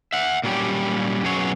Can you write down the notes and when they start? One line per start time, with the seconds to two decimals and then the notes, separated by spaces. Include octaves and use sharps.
0.13 E5 F#5
0.43 A#2 F#3 G3 C#4 D4 G4
1.24 F#2 B2 F#3 B3 G#4 C#5